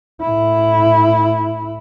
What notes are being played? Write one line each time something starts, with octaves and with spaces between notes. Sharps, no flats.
A2 E4